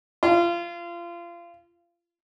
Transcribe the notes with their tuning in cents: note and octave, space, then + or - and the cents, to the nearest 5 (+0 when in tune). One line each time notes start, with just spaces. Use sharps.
F4 -25